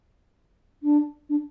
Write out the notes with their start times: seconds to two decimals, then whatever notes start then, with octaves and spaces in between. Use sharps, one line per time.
0.83 D4
1.29 D4